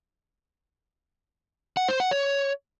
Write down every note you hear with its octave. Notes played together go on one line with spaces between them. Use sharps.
F#5
C5
F#5
C#5